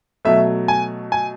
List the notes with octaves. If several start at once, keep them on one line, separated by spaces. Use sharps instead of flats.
B2 F#3 A3 E5
G#5
G#5